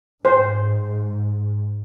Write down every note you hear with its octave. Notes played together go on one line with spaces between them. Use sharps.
G#2 C5